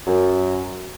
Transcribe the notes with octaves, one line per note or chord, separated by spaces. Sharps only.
F#2